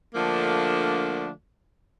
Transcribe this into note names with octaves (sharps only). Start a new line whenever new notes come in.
D3 F3 A3 A#3 D4